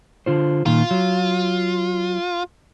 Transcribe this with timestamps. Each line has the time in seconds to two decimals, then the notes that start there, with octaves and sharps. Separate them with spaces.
0.26 D3 F4 C5
0.66 A#2 D#3 F4
0.91 F#3